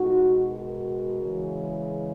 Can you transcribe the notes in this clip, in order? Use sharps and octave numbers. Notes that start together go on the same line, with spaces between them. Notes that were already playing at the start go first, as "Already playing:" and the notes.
Already playing: B2 G#3 D#4 F#4
F#4 A#4
C#3 E3 G#3